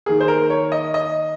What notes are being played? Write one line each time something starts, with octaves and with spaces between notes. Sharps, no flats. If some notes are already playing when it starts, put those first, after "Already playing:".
D#3 A#3 G#4
C5
A#4
C#5
D#5
D#5